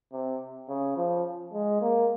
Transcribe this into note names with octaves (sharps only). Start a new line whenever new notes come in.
C3
C#3
F3
G#3
A#3